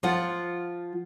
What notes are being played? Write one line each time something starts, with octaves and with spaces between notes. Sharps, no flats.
F3 F4 F#5